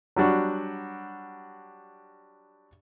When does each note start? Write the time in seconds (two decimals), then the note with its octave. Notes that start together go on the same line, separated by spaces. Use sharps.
0.16 F#3 G3 D4 F#4